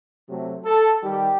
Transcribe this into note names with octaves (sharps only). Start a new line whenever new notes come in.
C3 F#3 A3
A4
D#3 G3 G4